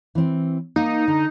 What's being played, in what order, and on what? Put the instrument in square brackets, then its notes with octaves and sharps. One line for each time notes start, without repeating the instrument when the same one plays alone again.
[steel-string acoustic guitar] E3 C4
[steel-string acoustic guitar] A#3 [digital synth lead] D#4
[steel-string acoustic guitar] D3